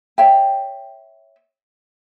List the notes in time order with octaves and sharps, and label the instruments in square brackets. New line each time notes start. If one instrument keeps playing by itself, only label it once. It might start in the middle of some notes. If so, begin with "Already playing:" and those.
[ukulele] C#5 E5 G5